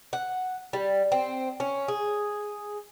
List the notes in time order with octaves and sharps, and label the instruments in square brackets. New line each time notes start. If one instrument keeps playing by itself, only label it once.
[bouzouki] F#5
G3
C4
C#4
G#4